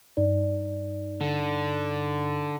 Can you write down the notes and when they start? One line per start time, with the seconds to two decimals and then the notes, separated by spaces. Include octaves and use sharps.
0.17 G2 D#4 D5
1.21 D3